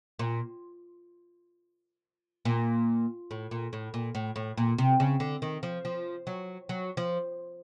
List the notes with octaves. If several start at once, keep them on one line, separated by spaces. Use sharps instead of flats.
A#2
A#2
A2
A#2
A2
A#2
A2
A2
A#2
C3
C#3
D3
D#3
F3
F3
F#3
F#3
F3